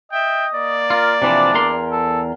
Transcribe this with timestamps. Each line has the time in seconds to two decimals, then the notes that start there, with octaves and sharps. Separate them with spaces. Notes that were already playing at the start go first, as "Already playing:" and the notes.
0.12 D#5 E5 G5
0.53 A#3 D5
0.90 F4 A#4
1.22 C3 E3 F3 D4
1.55 E2 A#4 C6
1.92 A4